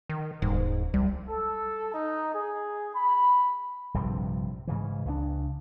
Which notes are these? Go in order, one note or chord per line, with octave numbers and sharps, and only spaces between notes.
D#3
D#1 G#2
C2 G3
A4
D#4
G#4
B5
A#1 G2 C3 F3
G#2 C#3 E3
C#2 C#3 E3 D4